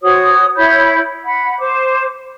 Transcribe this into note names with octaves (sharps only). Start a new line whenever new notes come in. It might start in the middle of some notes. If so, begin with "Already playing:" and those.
F#4 C5 C#5 D#6
E4 C#5 B5 G6
F#5 B5
C5 D6